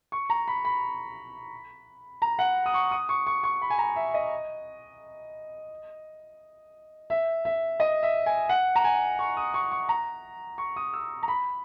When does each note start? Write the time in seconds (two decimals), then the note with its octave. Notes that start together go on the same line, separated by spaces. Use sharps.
0.12 C#6
0.30 A#5
0.48 B5
0.65 B5
2.22 A#5
2.39 F#5
2.66 D#6
2.74 C#6
2.91 D#6
3.09 C#6
3.27 C#6
3.44 C#6
3.62 B5
3.70 G#5
3.79 A#5
3.96 E5
4.14 D#5
7.10 E5
7.45 E5
7.80 D#5
8.03 E5
8.26 G#5
8.49 F#5
8.76 A#5
8.84 G#5
9.19 C#6
9.37 D#6
9.54 C#6
9.72 C#6
9.89 A#5
10.58 C#6
10.76 D#6
10.94 E6
11.23 A#5
11.28 B5